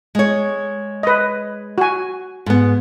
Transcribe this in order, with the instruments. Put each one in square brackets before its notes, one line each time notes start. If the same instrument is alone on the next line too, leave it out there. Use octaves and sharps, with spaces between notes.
[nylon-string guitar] G#3 C#5
[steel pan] B4 D#5
F#4 G#5
[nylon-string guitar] G#2 B3